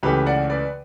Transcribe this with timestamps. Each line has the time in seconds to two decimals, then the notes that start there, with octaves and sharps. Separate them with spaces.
0.03 C#2 C#3 E3 A3 G4 B4
0.26 D5 F#5
0.50 B4 D5